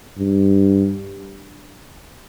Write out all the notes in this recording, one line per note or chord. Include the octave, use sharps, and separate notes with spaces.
G2